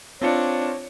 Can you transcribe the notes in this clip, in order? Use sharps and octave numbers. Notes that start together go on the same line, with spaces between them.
C4 D4 F4 C#5 C#7